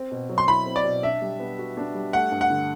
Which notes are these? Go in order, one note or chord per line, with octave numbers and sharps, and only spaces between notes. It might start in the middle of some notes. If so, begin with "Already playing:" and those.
Already playing: C4
B2
F#3
C6
E4 B5
C4
D5
B2
D4 E5
G3
B3
F#4
D4
G3
A3 F#5
G2
F#5
D3